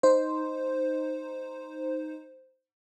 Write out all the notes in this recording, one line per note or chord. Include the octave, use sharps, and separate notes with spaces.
D#4 C5